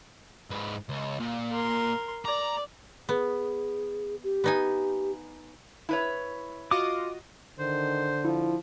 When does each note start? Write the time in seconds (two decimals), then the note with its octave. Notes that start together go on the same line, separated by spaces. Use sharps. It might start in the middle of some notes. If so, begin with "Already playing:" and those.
0.50 G#2 B4
0.89 C#2
1.20 A#2
1.52 A#4 C6
2.25 D5 A#5
3.09 B3 G#4
4.24 G4
4.44 B3 D#4 G#5
5.89 E4 B4 C#5
6.71 F4 F#4 D#5 D6
7.59 D3 D#3 C5
8.25 F3 E4